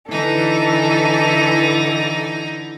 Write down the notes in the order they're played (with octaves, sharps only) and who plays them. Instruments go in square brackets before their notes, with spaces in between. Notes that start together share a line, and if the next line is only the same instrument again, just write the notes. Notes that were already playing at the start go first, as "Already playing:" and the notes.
[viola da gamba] D3 E4 [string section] E3 [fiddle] D#4 [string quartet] A4